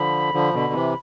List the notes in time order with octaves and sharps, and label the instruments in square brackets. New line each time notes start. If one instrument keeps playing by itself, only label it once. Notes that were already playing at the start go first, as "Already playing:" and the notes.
Already playing: [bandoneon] D3 F3 [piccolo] B5
[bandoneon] D3 F3
B2 D3
C3 E3